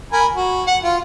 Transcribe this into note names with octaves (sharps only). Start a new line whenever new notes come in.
A#4 G#5 B5
F#4
F#5
F4